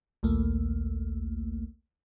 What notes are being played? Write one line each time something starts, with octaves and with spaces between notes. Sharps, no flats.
A#1 D#2 A3 A#3